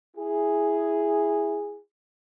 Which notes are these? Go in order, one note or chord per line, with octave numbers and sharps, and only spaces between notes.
E4 G#4